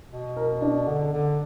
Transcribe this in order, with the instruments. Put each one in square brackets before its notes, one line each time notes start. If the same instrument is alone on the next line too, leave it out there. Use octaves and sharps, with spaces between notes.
[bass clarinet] B2
[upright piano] A#4
D4 D5
[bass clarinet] D3
D3